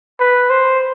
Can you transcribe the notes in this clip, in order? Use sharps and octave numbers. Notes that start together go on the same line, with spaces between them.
B4
C5